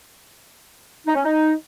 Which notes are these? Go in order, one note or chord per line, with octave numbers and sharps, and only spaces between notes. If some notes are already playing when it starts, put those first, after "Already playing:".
D#4
C#4
D#4